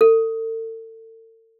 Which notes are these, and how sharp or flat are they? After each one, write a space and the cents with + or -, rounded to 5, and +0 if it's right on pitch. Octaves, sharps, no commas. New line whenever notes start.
A4 +40